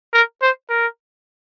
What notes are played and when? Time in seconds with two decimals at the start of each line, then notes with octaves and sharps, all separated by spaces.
0.13 A#4
0.42 C5
0.70 A#4